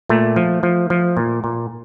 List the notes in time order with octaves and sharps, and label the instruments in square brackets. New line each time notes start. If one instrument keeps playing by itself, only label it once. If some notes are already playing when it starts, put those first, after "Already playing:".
[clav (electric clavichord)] A#2 A3
F3
F3
F3
A#2
A#2